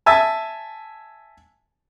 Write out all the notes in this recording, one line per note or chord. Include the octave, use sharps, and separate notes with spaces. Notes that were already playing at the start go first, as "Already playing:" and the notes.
E5 G#5 A5